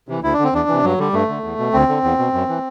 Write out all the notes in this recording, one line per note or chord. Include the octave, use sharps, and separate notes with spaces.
C3 E3
D2 E4
D4
D3
C4
E2 D4
C3 E3
G2 F#3
D3 G3
G2 A3
D3
E2
B2
D2 C4
D3
E2
B2
F#2
E3